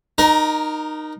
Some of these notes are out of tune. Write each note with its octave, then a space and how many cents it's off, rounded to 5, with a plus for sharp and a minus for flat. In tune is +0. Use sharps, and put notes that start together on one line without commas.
D#4 -15 A#4 +15